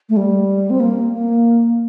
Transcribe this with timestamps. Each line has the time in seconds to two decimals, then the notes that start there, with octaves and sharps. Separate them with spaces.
0.09 A3
0.17 G3
0.70 C4
0.80 A#3
1.13 A#3